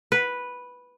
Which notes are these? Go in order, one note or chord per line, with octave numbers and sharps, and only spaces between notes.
B4